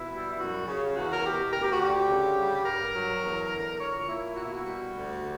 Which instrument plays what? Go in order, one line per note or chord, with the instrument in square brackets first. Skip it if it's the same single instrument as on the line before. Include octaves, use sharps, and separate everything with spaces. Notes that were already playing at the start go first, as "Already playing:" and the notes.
Already playing: [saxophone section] B2 E4
G3
E4
F#2 F#4
C#3
E2 F#4
A#4
B2 G4
D2 A#4
G4
F#4
D3 G4
C#3
G3
G4
G2 A#4
F#3
E2
D3
A#2 C#5
A#3 E4
B2 F#4
E4
F#4
G3
D2
D3